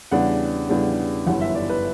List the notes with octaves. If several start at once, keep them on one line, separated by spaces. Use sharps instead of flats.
E2 C#3 G3 B3 D4 F#5
E2 C#3 G3 B3 D4
G1 F#2 E3 F#5
E5
D5
B4